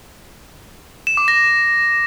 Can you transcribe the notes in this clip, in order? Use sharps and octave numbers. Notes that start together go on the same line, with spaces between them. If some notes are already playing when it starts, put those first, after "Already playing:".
E7
D6
A#6